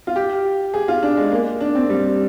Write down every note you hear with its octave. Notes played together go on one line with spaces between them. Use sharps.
F4
G4
G#4
F4
D4
G#3
A#3
D4
C4
G3